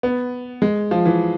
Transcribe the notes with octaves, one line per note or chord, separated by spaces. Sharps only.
B3
G#3
F3
E3